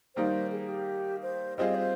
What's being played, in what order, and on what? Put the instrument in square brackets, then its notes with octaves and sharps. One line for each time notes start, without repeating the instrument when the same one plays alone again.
[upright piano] D#3 G3 A#3 D#4 [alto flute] C5
[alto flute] G#4
G4
C5
[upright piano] G3 C4 F4 G#4 [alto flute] D#5
[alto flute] C5